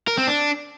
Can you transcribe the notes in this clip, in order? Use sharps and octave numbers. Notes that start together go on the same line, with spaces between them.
A#4
C4
D4